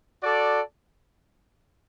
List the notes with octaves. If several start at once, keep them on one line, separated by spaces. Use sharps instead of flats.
F#4 A4 D5